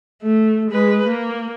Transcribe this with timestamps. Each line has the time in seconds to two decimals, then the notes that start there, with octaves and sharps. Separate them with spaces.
0.22 A3
0.71 G#3 B4
1.07 A#3